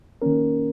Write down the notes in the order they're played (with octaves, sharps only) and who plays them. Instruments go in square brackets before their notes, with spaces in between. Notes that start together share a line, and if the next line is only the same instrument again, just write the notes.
[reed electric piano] D#3 A#3 C#4 A#4